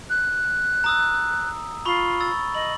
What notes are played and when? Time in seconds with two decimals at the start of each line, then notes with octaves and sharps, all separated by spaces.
0.10 F#6
0.84 A#5 D#6 E6
1.85 F4 B5 C#6 G7
2.20 E6 A6
2.55 D#5 F#7